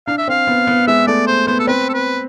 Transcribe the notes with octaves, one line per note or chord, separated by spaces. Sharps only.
D4 F5
E5
C4 F5
B3
B3
G#3 E5
A3 D5
C5
B3 C5
A4
C4 B4
A4
B4